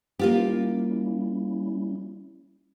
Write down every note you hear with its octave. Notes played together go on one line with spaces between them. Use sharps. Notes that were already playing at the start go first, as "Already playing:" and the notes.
G3 A#3 C#4 E4 F4 G4